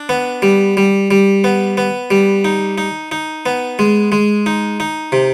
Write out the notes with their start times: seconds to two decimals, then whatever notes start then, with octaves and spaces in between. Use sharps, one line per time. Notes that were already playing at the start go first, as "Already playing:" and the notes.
Already playing: D4
0.09 B3
0.42 G3
0.77 G3
1.11 G3
1.44 B3
1.77 B3
2.11 G3
2.45 D#4
2.78 D#4
3.12 D#4
3.46 B3
3.79 G#3
4.12 G#3
4.46 D#4
4.80 D#4
5.12 C3